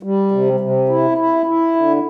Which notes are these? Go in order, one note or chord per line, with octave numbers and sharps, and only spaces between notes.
G3
C3
C3
E4
E4
E4
D3